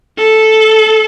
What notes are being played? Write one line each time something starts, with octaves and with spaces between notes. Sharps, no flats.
A4